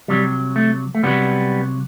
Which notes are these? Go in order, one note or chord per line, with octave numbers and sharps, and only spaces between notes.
C2 C3 F#3 G3
A3
A3
C2 C3 F#3 G3 B3